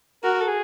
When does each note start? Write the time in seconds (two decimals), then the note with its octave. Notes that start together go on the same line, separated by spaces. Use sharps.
0.23 F#4 A#4
0.41 A4
0.47 G#4